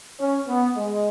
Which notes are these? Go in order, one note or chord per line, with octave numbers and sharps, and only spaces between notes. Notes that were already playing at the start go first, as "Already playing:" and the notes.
C#4
B3
G#3